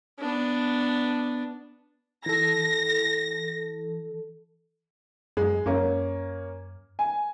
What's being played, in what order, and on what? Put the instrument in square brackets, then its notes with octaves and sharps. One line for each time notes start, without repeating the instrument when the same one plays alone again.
[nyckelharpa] B3 D4
[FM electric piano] E3 A4 [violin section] A#6
[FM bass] F#2 [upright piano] G#3
[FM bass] F#2 [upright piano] A#3 C#4
[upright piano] G#5